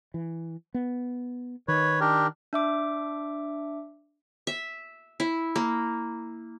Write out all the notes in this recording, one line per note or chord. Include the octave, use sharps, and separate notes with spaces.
E3
B3
D#3 B4 C#5
D4 G4 A#4
D4 E5 D6
E5
E4
A#3